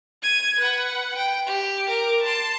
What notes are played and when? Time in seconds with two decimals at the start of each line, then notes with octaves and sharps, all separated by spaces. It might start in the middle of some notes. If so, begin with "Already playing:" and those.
0.23 G#6 D#7
0.59 B4 F#5
1.16 G5
1.47 G4
1.87 A#4 D6
2.22 A5 C6